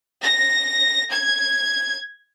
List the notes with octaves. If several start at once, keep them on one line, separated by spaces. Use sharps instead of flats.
A#6
G#6